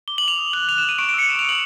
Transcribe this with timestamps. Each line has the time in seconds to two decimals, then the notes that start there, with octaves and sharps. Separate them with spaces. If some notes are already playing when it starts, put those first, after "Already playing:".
0.08 D6 G7
0.18 F#7
0.24 D6 F7
0.38 D#6
0.53 F#6 F#7
0.68 F#6 F7
0.78 E7
0.83 F#6
0.89 D#7
0.98 C#6 D7
1.09 D7
1.14 E6 C#7
1.29 F#6 E7
1.39 F7
1.44 D#6
1.49 F#7